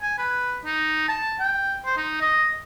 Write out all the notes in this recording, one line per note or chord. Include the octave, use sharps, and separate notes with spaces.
G#5
B4
D#4
A5
G5
C5
D#4
D#5